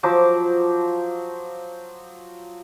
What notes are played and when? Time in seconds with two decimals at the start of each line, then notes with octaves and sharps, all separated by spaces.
0.03 F3 F#3 C5 D6